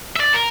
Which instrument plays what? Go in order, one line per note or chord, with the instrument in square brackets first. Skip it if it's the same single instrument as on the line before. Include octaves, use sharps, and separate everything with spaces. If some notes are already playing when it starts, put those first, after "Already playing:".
[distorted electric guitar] E5
D5
A#4